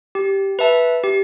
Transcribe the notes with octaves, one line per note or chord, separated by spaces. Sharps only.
G4
B4 E5 A5
G4